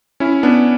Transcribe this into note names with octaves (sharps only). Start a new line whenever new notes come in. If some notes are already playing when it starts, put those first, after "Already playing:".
C#4 E4
B3 D4